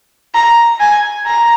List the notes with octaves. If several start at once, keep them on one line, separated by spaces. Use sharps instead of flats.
A#5
G#5
A#5